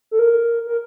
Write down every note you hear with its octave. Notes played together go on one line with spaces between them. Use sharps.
A4
A#4
A#4